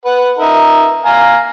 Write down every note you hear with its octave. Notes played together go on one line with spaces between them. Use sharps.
B4 F#5
D#4 A#4 E5
F5 G#5 A#5